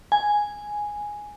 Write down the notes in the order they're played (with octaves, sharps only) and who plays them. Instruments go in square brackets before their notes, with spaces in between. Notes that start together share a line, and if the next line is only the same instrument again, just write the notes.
[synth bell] G#5